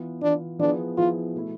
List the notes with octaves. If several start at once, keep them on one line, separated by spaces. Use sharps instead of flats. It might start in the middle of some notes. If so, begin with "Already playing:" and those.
Already playing: E3 B3 F4
E3 B3 D4 F4
F3 B3 D4 E4 G#4 B4
F3 B3 E4 F4 G#4 B4
B2 A3 E4